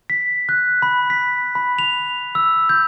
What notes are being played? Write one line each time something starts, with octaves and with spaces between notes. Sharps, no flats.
B6
F#6
B5
B6
B5
F7
E6
G6